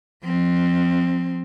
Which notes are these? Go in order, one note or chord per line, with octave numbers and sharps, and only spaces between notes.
F3 C4